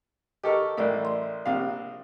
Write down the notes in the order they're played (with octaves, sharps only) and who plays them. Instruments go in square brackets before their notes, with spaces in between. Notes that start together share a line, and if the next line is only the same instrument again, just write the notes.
[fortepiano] G4 A4 A#4 [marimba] D#5 C#6
[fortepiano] A1 A2 [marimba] A#4 D5 E5
[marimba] D5 C6
[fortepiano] A#1 C3 F5